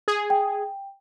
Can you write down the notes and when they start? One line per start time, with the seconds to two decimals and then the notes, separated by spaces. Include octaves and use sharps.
0.08 G#4
0.30 G5